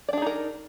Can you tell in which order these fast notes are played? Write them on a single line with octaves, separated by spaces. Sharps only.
D5 D4 G#4 D#4 A#4